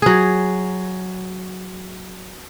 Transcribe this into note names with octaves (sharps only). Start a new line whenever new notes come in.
F#3 G#4